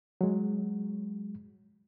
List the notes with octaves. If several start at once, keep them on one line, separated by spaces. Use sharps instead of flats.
F#3 G#3